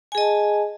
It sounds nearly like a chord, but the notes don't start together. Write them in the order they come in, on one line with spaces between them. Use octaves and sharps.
G#5 G#4 D#5 A5